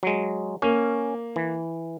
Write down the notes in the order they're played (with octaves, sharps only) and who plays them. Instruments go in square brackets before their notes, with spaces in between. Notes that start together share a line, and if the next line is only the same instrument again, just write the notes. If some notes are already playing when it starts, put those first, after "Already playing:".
[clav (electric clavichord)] F#3 G#3
[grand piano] A#3 [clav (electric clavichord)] C#4
[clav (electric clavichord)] E3